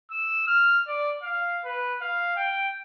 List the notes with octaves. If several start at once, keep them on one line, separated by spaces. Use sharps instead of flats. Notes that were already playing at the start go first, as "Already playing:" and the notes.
E6
F6
D5
F5
B4
F5
G5